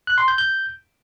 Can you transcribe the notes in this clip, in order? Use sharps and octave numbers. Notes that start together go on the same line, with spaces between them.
F#6
C6
G6
G6